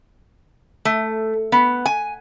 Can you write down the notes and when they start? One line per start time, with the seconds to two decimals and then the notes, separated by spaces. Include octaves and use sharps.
0.85 A3
1.52 B3
1.86 G#5